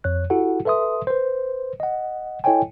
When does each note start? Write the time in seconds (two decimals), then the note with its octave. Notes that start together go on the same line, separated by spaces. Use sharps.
0.04 F2 C#5 F#6
0.30 E4 F#4 G4 A4 F#5
0.65 A4 B4 E5 C6 D#6
1.07 B4 C5
1.80 D#5 F#5
2.44 E4 A4 C#5 D#5 G5 G#5